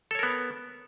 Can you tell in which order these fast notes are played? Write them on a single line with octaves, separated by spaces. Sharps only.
A4 C#5 A#4 B3